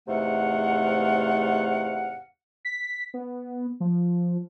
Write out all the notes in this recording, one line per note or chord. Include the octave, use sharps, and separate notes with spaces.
E2 G#2 C3 A3 F5 F#5
B6
B3
F3